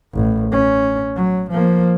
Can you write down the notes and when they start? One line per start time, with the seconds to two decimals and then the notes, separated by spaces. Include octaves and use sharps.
0.14 A1
0.52 C#4
1.15 F#3
1.50 F3 A#3